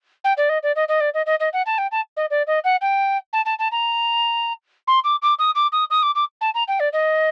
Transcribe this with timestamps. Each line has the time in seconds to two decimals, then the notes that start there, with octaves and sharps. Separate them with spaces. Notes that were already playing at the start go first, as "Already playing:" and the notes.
0.24 G5
0.37 D5
0.49 D#5
0.63 D5
0.75 D#5
0.88 D#5
1.00 D5
1.14 D#5
1.26 D#5
1.40 D#5
1.53 F#5
1.66 A5
1.78 G5
1.91 A5
2.16 D#5
2.30 D5
2.47 D#5
2.64 F#5
2.81 G5
3.33 A5
3.45 A5
3.59 A5
3.72 A#5
4.87 C6
5.04 D6
5.22 D6
5.39 D#6
5.55 D6
5.72 D#6
5.90 D#6
6.02 D6
6.15 D6
6.41 A5
6.54 A#5
6.68 G5
6.80 D5
6.92 D#5